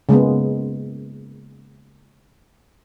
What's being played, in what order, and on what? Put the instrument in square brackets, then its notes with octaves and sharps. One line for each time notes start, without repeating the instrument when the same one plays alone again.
[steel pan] C#3 G#3 A#3 B3